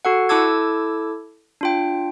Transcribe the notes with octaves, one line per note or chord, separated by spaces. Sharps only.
F#4 A4 F#5
E4 A4 A5 D6 E6 G#6
D4 F4 G5